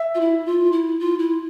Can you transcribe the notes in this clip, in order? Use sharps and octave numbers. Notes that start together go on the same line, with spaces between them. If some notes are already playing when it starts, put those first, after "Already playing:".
Already playing: E5
F4
E4
F4
E4
F4
E4